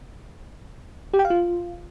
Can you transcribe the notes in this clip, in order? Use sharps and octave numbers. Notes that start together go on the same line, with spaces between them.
G4
G5
F5
F4